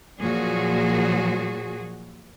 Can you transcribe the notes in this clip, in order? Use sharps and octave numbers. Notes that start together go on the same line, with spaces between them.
A#2 F3 F#3 F#4 G#4